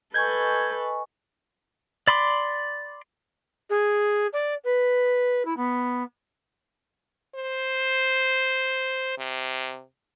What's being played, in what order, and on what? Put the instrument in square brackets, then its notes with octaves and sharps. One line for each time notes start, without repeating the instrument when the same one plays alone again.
[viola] A4 B4 [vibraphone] D#5 G#5 C#6 [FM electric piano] G6 G#6
[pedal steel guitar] D5 B5 C6 D6
[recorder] G#4
D5
B4
E4
B3
[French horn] C5
C3